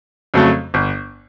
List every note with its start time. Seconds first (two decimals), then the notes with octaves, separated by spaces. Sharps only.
0.34 F2 C#3 F#3 A3
0.74 G1